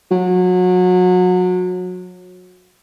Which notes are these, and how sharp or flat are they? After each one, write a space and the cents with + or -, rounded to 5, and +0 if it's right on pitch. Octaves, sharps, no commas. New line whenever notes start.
F#3 -30